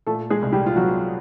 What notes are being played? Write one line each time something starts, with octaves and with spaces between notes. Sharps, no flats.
A#2 A3 A4
G#3 G#4
C2
G3 G4
F4
F#3 B3 F#4